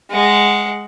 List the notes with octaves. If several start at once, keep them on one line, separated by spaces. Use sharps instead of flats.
G#3 F#5